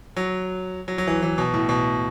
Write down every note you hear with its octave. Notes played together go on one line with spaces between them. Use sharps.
F#3
F#3
F#3
E3
E3
B2
A2
B2